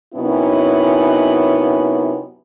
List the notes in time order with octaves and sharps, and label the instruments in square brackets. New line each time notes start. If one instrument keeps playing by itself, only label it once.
[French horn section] F#2 C3 B3 C#4 D#4 E4